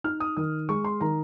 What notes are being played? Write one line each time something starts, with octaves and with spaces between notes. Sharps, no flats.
D#4 F6
D#6
D#3 D#6
G#3 C#6
C6
D#3 A#5